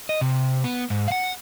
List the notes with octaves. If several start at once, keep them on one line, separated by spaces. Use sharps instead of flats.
D#5
C3
B3
G#2
F5 F#5